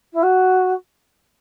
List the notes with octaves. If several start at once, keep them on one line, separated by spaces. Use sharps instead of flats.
E4
F#4